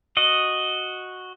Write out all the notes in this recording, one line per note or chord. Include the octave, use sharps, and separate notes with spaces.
F#4 D#5